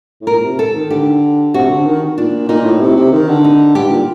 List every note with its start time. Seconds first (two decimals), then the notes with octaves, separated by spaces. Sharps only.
0.21 A2
0.27 A#2 A#4
0.43 C3
0.59 A4
0.75 D#3
0.90 D3 G4
1.54 C3 F#4
1.70 D3
1.85 D#3
2.18 A#2 D4
2.49 A#2 D#4
2.65 A2
2.80 C3
2.96 C3
3.12 D#3
3.28 D3
3.44 D#4
3.75 G2 G4
3.91 A#2